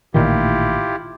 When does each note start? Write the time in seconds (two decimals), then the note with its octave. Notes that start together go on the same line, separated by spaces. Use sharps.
0.14 A1 A#2 D#3 E4 F4 G4